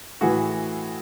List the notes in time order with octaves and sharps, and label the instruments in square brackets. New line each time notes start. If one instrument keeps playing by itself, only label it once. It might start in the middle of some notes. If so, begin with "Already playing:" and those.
[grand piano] A2 E3 F#4 G#4